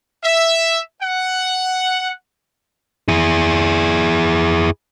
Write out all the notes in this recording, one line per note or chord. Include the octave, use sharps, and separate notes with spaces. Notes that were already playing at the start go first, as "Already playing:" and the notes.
E5
F#5
E4 G#4